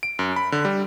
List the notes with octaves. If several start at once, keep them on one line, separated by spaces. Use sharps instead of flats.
D7
F#2
B5
D3
G3